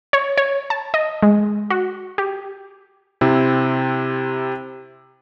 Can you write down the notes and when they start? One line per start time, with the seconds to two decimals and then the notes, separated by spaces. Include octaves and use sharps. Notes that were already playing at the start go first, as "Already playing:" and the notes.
0.13 C#5
0.38 C#5
0.70 A5
0.94 D#5
1.22 G#3
1.70 F#4
2.18 G4
3.21 C3 C4 E4